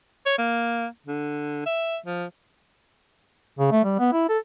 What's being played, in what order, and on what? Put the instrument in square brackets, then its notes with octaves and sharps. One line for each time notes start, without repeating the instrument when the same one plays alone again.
[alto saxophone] C#5
A#3
D3
E5
F3
[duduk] C#3
A3
G3
B3
E4
A4